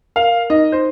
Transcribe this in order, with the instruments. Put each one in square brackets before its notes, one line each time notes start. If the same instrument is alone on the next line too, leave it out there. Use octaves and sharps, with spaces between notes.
[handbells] A#4 [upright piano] F5
[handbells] D#4 [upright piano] D#5
[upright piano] C5